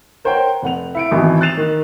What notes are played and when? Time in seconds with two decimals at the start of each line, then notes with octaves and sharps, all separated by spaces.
0.25 A#4 C5 C#5 F#5 G5
0.62 F1 F#5 F7
0.95 E4 C#7 D7
1.11 G#1 E2 B2 E3
1.41 F#6 A6 C7 E7 F7
1.57 D#3